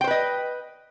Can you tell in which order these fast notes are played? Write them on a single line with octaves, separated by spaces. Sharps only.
G5 C5 B4 D#5